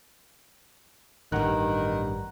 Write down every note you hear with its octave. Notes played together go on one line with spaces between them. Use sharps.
A1 G2 D#3 F#5 A#5 F#6